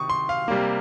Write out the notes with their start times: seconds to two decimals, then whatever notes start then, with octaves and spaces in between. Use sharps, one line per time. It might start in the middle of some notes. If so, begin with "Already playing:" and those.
Already playing: C3 D#3 C#6 D#6
0.10 C6
0.29 F5
0.48 C3 G3 A#3